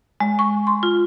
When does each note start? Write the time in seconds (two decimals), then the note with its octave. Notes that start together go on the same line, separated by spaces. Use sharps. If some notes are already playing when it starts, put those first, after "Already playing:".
0.20 G#3
0.39 C#6
0.67 C6
0.83 F4